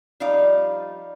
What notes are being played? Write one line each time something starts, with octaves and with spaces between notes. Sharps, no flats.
F3 G3 D#4 D5 F5